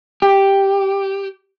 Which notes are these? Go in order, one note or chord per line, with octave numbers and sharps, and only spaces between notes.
G4